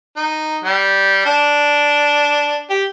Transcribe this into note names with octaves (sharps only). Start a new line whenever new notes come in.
D#4
G3
D4
G4